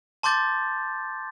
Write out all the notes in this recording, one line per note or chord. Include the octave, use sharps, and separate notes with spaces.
A5 C6 D6 G6 A6